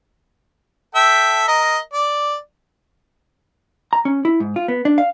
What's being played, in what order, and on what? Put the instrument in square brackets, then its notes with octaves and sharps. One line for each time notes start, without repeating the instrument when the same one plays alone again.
[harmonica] A4 E5 G5
A#4 D#5
D5
[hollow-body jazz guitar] A#5
C#4
E4
G#2
F4
B3
D4
F5